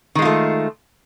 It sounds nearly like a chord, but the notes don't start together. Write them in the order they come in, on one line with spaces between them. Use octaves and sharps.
D#3 G#3 F4 A3